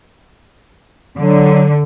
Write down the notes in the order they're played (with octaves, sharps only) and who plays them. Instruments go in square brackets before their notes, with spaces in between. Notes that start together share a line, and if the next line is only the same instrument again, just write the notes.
[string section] D3 [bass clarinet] F#3